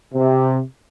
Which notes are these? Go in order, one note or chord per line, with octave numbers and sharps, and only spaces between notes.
C3